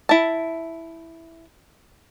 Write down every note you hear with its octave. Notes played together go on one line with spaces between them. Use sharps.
E4 A5